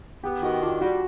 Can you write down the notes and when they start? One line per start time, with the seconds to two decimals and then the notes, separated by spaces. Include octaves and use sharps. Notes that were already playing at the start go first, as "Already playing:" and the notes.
0.24 B3 G4
0.43 D#3 F#4
0.62 D4 F4
0.81 G3 F#4